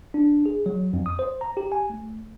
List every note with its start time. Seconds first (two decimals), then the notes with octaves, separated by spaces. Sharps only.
0.14 D4
0.46 G#4
0.66 F#3
0.93 F2
1.06 D#6
1.19 C5
1.41 A#5
1.57 G4
1.72 G#5
1.90 A3